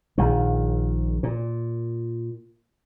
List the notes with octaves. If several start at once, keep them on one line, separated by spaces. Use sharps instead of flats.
A#1 D#3
A#2